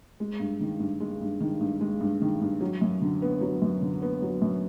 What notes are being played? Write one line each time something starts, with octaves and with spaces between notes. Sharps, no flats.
G#3
G2
D#3
G2
G#3
G2
D#3
G2
G#3
G2
D#3
G2
F#3
F#2
D3
B3
F#3
F#2
D3
B3
F#3
F#2